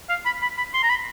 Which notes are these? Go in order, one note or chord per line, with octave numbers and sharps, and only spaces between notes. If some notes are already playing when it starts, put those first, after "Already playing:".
F5
B5
B5
B5
C6
A#5
B5